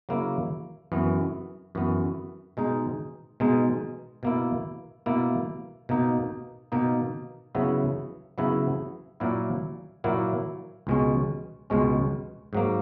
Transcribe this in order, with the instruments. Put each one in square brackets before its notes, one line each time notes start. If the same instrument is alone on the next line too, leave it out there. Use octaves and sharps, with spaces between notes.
[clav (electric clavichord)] C#3 F#3 A#3 E4
F#2 E3 B3
F#2 E3 B3
B2 G#3 D#4
B2 G#3 D#4
B2 A#3 E4
B2 A#3 E4
B2 A#3 D#4
B2 A#3 D#4
C#3 F#3 B3 E4
C#3 F#3 B3 E4
A#2 F#3 A#3 E4
A#2 F#3 A#3 E4
C#2 B2 G#3 C#4
C#2 B2 G#3 C#4
G#2 F#3 A#3